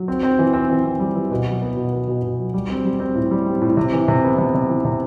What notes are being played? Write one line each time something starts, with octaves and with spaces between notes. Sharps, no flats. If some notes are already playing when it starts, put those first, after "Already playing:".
Already playing: F#3
C4
C4
E3
C4
E3
C4
G3
E3
B2
F#3
B3
B2
B3
B2
B2
F#3
G3
C4
G3
C4
A2
G3
C4
A2
C3
E3
C3
B3
C3
C3
E3
C3